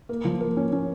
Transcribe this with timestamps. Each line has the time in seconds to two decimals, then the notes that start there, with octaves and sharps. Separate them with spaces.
0.09 A#3
0.25 F3
0.40 A#3
0.57 C#4
0.72 C#4